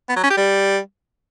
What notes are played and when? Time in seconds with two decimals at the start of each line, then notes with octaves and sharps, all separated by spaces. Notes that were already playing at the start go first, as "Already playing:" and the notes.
0.09 B3
0.16 F#3
0.23 C#4
0.30 G4
0.37 G3